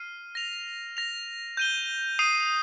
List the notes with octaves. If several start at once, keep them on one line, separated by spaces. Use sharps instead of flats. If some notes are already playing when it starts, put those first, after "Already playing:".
Already playing: F6 C7 D#7
A#6 F7
A#6 F7
G6 D#7 G7
D#6 C7 D#7